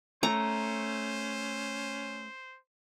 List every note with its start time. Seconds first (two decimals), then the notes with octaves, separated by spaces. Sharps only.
0.23 A3 C#4 C5 A#5